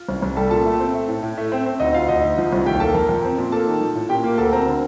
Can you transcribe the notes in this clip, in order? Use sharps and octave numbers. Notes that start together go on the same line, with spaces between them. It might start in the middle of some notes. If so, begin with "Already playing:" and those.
Already playing: F4
C2
C2
G3 A4 A5
A#2 A4 A5
A3
C4
A3
A2
A2
A3
C4
C4
D2 D#4 D#5
D2 F4 F5
D2 D#4 D#5
D2
F3
C2
D#2 G4 G5
A#3 A4 A5
F2 A#4 A#5
F2
C4
A#2
A#3 A4 A5
D#3
F3
A2
A#2 G4 G5
A#3
D2 A4 A5
C4 A#4 A#5
D3